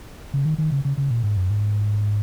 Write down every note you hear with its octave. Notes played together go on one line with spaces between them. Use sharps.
C#3
D#3
D#3
C#3
C#3
C#3
A#2
G#2
F#2
G#2